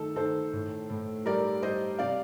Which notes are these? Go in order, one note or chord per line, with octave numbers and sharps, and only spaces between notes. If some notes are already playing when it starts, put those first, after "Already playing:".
Already playing: D#3 A3 A4
D#3 A4 C5
A2
A2
G3 A#4 D5
G3 C5 D#5
C3 D5 F5